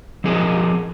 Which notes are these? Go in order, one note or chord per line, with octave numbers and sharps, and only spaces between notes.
F3 C4 G#4 A#4 D#5